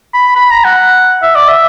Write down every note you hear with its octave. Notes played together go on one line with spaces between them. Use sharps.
B5
B5
A#5
F#5
E5
D5
E5